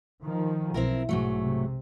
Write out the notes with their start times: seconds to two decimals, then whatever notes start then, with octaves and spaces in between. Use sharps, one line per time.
0.24 D#3 F3
0.74 B1 C4 E4 A#4
1.09 B1 G#2 F#3 A3
1.43 C3